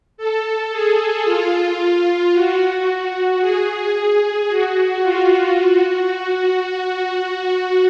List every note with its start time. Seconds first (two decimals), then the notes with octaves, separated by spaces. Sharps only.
0.17 A4
0.72 G#4
1.25 F4
2.33 F#4
2.87 F#4
3.41 G#4
4.49 F#4
5.02 F4
5.56 F#4